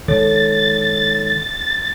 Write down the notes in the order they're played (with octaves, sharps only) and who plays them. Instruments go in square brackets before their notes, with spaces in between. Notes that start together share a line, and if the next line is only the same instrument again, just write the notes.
[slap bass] D#3 G#3 [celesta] A4 C#5 [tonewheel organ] A6